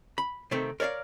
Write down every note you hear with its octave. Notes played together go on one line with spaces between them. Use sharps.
B5
C3 D#3 A3 C4
A#4 C#5 D5 E5 F5